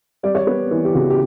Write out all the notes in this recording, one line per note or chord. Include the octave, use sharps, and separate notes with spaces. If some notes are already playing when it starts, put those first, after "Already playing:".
G3 D5
C#5
B3 B4
E3
G4
C#3 F#4
G4